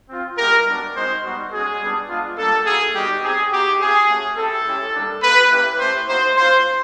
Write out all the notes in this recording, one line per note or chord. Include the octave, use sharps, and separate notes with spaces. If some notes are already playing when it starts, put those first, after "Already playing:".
C4 F4
G#3 B3 E4 G4 A#4
G3 B3 D4 F#4
G#3 C4 D#4 F#4 C5
G3 B3 D#4 F#4
G#3 C#4 F#4 G#4
G3 B3 D4
G#3 B3 D4 F4
G3 A#3 D4 A4
A#3 D#4 F#4 G#4
G3 B3 D#4 F#4 G4
C4 D#4 G4 G#4
B3 D#4 F#4 G4
C4 F4 G#4
A3 C#4 F#4
C4 E4 G4 A4
G#3 C#4 E4 G4
G3 A#3 D4
A#3 D#4 G4 B4
A#3 C#4 E4 G4 B4
A3 C#4 E4 G4 C5
A#3 D#4 F#4 C5
A#3 C#4 F4 C5